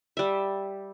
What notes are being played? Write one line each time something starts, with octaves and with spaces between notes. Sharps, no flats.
G3 E5